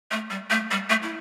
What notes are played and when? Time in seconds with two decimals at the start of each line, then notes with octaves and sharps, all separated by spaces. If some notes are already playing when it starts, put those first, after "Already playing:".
0.11 A3
0.30 G3
0.50 A3
0.71 G3
0.90 A3
1.03 E4